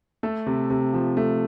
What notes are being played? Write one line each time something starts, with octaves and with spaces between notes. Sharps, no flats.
A3 A4
C3
C3
F3
A3